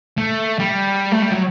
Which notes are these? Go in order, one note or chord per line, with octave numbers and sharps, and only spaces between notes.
A3
G3
A3
G3
F#3